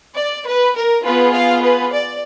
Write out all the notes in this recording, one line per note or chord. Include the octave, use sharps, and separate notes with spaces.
D5
B4
A#4
B3 F4 G#4 B4
F5
B4
D5